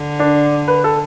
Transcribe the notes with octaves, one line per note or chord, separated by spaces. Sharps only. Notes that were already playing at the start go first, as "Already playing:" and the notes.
Already playing: D3
D4
B4
A4